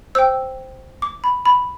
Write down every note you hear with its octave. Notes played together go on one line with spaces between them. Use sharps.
C5 G5 E6
D6
B5
B5